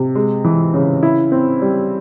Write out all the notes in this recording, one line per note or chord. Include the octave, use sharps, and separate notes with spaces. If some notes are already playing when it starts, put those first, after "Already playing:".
Already playing: C3
G#3
E3
C#3
E4
C4
G3